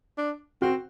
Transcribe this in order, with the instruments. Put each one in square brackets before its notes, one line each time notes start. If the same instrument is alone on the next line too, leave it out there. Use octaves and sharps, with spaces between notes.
[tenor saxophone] D4
[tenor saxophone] C4 [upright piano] F#4